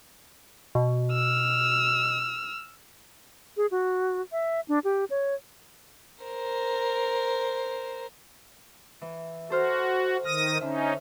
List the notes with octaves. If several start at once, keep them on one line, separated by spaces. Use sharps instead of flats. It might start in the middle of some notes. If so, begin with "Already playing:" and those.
B2
E6 F6
G#4
F#4
E5
D4
G4
C#5
A#4 C5
E3
F#4 A4 C5 F6
D#3 D#6 F6 A#6
D3 C#4 D#4 E5